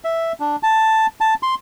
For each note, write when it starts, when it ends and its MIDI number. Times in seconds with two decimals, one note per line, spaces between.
0.04 0.32 76
0.40 0.56 62
0.63 1.06 81
1.21 1.34 81
1.43 1.55 84